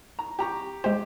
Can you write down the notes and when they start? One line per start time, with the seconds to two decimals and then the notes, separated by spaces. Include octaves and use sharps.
0.19 A#5
0.39 G4 A#5 C#6
0.84 G#3 G4 C5